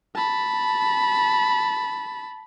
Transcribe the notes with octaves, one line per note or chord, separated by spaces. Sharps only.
A5 B5